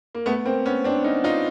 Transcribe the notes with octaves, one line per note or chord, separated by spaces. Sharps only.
A#3
A3 B3
A#3 C4
B3 C#4
C4 D4
C#4 D#4
D#4 F4